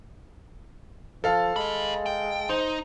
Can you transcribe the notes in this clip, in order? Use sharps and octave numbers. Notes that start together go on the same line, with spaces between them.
F3 A4 F5
G#3 G#4 B5
G5
D#4 C5